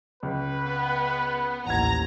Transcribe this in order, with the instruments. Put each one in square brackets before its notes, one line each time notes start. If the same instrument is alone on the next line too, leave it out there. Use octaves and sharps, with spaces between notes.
[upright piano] C#2 [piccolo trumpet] B4
[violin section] B3
[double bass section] A1 D#2 A2 [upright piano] F#5 G#6 [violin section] A#5